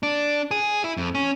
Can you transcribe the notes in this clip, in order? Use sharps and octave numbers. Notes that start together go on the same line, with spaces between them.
D4
G#4
E4
F2
C#4